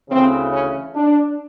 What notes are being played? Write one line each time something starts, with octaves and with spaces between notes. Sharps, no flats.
D2 C#3 E3 C4
C#4
D4